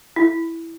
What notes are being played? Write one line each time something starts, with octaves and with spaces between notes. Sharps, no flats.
E4